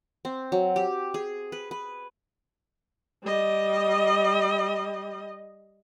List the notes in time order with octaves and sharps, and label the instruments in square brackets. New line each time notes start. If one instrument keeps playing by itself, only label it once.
[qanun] C4
F#3
G4
G#4
B4
B4
[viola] G3 D#5